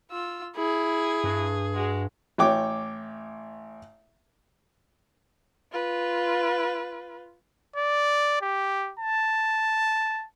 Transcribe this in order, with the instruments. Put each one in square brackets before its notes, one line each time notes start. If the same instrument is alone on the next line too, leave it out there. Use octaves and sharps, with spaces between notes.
[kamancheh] F4 E6
[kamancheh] E4 [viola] G#4
[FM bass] G2
[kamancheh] G#3 F#4
[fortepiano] A1 C#5 G5 D6
[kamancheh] F4 B4
[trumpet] D5
G4
A5